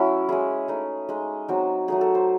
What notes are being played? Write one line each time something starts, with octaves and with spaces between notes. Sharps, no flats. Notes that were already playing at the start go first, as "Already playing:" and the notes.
Already playing: F#3 A3 C#4 E4
G#3 C#4 E4 G#4
A3 D#4
G#3 D#4
F#3 C4 D#4
F#3 A3 D#4 G#4
A4
C5